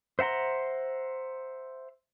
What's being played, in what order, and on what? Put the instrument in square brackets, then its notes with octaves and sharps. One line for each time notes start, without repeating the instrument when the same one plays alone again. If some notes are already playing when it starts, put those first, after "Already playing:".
[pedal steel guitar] C5 E5 F#5 A#5 C6